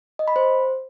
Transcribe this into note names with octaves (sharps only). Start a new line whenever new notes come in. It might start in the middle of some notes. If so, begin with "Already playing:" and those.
D#5
B5
C5